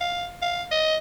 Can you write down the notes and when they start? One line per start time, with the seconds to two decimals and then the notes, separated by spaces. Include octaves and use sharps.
0.01 F5
0.42 F5
0.71 D#5